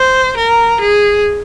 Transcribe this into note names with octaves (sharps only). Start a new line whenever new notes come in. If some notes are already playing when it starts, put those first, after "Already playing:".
Already playing: C5
A#4
G#4